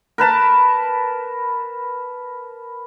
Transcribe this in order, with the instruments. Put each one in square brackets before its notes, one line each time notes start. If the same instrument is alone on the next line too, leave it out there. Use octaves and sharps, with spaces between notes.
[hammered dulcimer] A#4 B4 A5 B5